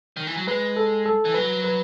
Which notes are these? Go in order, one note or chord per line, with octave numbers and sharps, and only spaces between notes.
D#3
E3
F#3
G#3 B4
A4
A4
E3
F#3 B4
B4